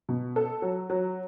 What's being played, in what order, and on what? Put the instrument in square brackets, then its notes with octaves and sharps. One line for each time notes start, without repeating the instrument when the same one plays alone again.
[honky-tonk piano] B2
A4
F#3
F#3